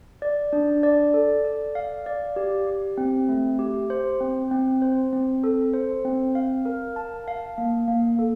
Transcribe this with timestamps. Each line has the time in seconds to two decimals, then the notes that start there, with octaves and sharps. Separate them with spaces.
0.22 D5
0.53 D4
0.83 D5
1.14 A4
1.45 D5
1.75 F5
2.06 D5
2.36 G4
2.67 G4
2.98 C4
3.29 A3
3.59 G4
3.90 C5
4.21 C4
4.51 C4
4.82 C5
5.13 C4
5.44 A4
5.73 C5
6.05 C4
6.35 F5
6.65 A#4
6.96 A5
7.28 F5
7.58 A#3
7.88 A#3
8.19 A4